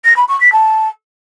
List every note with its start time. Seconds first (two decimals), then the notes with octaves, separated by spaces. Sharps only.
0.04 A#6
0.16 B5
0.28 C#6
0.40 B6
0.52 A5